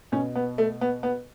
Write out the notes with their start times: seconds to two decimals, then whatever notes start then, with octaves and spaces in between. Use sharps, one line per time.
0.12 B2 C#4
0.35 B3
0.58 A3
0.81 B3
1.03 B3